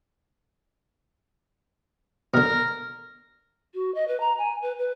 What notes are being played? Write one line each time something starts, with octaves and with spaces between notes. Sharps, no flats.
B2 D3 A#4
F#4
D#5
B4
A#5
G#5
B4
B4